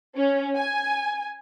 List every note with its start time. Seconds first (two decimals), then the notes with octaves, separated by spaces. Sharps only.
0.16 C#4
0.57 G#5